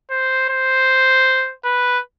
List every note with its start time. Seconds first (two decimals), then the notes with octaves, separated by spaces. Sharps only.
0.11 C5
0.49 C5
1.65 B4